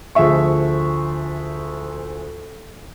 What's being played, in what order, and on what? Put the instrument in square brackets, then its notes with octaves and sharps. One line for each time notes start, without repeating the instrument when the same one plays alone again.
[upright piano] D2 F3 G#4 E5 C#6